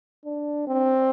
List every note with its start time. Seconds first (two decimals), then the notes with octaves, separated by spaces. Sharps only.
0.25 D4
0.67 C4